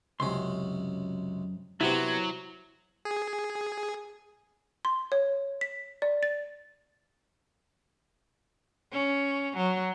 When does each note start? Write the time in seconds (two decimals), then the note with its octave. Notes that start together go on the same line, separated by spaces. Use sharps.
0.20 C#2 F#2 C3 C#4 F#4 C6
1.81 C3 F#3 B3 E4 F#4 G4 C5
3.05 G#4
4.85 C6
5.12 C#5
5.61 B6
6.02 D5
6.23 A6
8.92 C#4
9.57 F#3